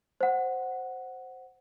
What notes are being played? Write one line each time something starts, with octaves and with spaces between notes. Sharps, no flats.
C5 F#5